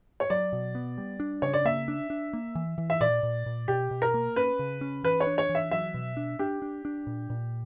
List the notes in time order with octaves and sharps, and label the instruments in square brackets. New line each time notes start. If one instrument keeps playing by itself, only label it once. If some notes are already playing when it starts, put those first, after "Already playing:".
[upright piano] C#5
[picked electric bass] F#3 [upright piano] D5
[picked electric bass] B2
B3
G3
D4
[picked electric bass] C#3 [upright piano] C#5
[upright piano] D5
[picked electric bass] A#3 [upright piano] E5
[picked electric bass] D4
D4
A#3
E3
E3
[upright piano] E5
[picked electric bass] A#2 [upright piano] D5
[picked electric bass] A#2
A#2
[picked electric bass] B2 [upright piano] G4
[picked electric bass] B2
[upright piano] A#4
[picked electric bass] A#3
[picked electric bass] C#4 [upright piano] B4
[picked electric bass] C#3
C#4
[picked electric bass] E3 [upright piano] B4
[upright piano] C#5
[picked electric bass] D4
[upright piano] C#5
[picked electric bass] E3
[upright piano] E5
[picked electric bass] F#3 [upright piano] E5
[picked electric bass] B2
D4
[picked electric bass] D4 [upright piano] G4
[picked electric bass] D4
D4
A#2
A#2